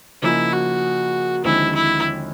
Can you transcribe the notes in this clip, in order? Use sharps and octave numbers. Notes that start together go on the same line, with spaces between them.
C#3 F3 A#3 D#4 E4 G#4
F#4
D#2 D3 F3 G#3 C4 E4
E4